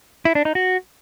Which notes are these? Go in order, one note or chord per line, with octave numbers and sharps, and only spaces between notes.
E4
D4
D#4
F#4